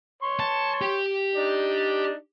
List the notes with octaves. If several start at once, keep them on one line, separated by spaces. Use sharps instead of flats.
C#5 C6 C#6
A5
G4
D4 D#4 D5